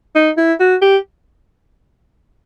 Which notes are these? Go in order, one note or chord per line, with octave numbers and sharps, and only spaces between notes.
D#4
E4
F#4
G4